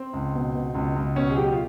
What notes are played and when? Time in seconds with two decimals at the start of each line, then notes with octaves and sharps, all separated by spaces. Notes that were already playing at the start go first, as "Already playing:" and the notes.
Already playing: C4
0.13 C#2
0.34 B2
0.54 B2
0.75 C#2
0.96 C#2
1.16 B2 C#4
1.30 G#4
1.36 F#3 G4
1.52 F4